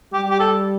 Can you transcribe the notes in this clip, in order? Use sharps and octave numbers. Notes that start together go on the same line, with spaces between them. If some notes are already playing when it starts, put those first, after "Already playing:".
G3 G4
G4
A4